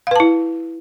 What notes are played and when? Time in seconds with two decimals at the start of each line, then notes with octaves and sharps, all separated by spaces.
0.07 F5
0.11 B4
0.16 A5
0.20 E4